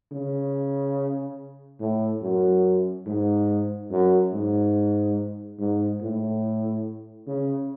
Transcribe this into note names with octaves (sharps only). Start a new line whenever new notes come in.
C#3
A2
F#2
G#2
F#2
G#2
G#2
A2
C#3